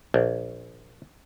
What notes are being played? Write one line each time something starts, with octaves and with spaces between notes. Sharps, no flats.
A#1